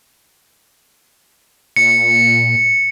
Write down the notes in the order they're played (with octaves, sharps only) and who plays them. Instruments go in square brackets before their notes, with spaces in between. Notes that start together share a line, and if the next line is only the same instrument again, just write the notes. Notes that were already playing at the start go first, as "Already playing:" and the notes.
[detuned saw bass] A#2 [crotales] C#7